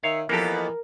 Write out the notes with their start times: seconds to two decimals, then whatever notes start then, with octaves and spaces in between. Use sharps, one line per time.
0.03 D#3 C#5 E5 F5
0.29 F2 E3 A#3 B3 F#4 G4 A4 A#4